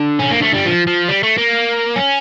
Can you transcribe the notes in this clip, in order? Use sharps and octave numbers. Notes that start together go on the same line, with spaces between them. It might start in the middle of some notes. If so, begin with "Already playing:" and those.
Already playing: D3
C#4
A#3
A3
G3
F3
F3
G3
A3
A#3
C#4